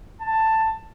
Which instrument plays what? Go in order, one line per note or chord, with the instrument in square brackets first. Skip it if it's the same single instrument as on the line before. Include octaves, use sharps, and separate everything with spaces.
[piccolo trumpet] A5